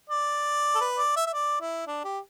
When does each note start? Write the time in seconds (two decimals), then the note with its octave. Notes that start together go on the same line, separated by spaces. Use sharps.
0.10 D5
0.75 A4
0.81 B4
0.98 D5
1.16 E5
1.26 E5
1.34 D5
1.61 E4
1.87 D4
2.04 G4